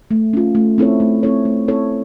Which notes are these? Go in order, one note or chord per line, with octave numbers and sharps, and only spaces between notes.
A3
C#4 F4
A3
C4 E4 A4 C#5
A3
C4 E4 A4 C#5
A3
C4 E4 A4 C#5